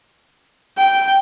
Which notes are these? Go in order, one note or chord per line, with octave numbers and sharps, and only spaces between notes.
G5